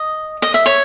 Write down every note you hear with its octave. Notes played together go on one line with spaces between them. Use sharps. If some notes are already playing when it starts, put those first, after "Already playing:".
Already playing: D#5
D#5
E5
C#5